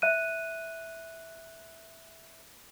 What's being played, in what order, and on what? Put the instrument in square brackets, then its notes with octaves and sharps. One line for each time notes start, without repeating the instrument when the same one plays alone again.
[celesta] E5 F#6 D#7